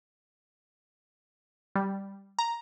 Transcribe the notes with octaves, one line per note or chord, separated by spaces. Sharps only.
G3
A#5